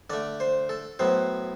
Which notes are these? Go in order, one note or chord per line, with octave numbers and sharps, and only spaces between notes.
D3 A3 D5
C5
A4
A2 F#3 B3 C5